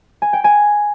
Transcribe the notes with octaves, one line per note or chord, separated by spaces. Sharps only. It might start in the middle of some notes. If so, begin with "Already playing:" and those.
G#5
G5
G#5